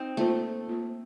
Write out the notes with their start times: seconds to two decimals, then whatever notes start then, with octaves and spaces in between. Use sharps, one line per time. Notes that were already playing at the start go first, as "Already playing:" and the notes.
Already playing: C4 D#4
0.17 A3 A#3 F4 C5
0.68 A#3 F4 C5